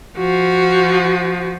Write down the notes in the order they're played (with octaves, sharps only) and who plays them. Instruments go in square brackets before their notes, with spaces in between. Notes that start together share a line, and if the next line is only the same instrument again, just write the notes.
[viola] F3 F#4